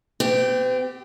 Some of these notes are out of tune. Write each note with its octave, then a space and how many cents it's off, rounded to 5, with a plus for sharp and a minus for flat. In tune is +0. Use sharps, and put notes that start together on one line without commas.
C4 -45 G4 +0